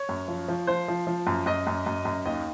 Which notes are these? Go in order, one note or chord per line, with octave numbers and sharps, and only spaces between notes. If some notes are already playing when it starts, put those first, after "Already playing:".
Already playing: C#5
F#2
F3
F3
F3 C5
F3
F3
F#2
F#2 D#5
F#2
F#2
F#2
D#2 D#5